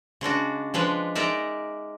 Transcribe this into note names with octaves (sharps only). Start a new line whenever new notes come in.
C#3 G#3 D4 F#4
F3 G#3 D4 B4
G#3 D#4 A#4 D5 E5